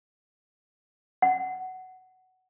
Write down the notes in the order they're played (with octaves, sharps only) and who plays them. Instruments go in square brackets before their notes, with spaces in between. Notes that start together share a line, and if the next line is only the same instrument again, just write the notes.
[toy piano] F#5